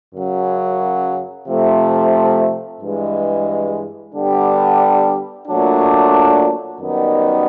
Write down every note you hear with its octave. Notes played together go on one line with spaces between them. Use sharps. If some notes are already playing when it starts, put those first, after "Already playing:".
F#2 C#3 F#3
C3 F3 A3
G2 E3 G#3
D3 G3 B3 D4 G4
A#2 F#3 A3 D4
F#2 D#3 G3 B3 D#4